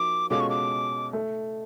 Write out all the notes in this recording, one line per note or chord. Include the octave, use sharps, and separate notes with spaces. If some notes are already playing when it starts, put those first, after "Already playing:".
Already playing: F3 A#3 D#4 F#4 D6
B2 G#3 C#4 F4 A4 D6
C#6
D6
A3